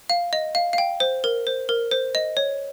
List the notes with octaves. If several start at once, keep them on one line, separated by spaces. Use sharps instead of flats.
F5
D#5
F5
F5
G5
C5
A#4
C5
A#4
C5
D#5
C#5